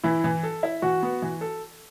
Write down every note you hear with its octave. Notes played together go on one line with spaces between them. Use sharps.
E3 E4
E3
A4
E4
E3 F#4
B3
E3
A4